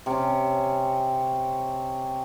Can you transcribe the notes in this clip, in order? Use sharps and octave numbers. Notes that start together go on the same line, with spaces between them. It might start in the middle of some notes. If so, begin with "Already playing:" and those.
C3 C#4